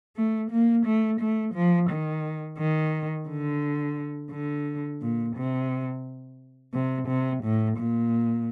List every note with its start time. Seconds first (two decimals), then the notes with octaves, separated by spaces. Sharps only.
0.17 A3
0.51 A#3
0.86 A3
1.20 A3
1.54 F3
1.90 D#3
2.58 D#3
3.28 D3
4.31 D3
5.02 A#2
5.36 C3
6.74 C3
7.08 C3
7.44 A2
7.78 A#2